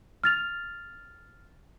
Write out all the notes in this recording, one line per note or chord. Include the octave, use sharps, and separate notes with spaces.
F6 A6 F7